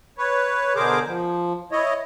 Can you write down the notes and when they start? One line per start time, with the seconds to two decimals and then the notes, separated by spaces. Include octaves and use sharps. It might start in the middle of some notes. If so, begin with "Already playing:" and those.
0.18 B4 C#5
0.76 B2 D3 G#4 A#4 C5 D6
1.07 F3
1.72 E4 C#5 D#5